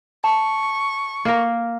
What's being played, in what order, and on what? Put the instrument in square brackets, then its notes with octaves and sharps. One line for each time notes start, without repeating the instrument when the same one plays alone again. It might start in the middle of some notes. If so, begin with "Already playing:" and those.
[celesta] A5 [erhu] C#6
[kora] A#3 A#4